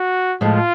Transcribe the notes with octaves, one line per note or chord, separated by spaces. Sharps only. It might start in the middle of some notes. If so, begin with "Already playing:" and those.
Already playing: F#4
A2 F3 G#3 F4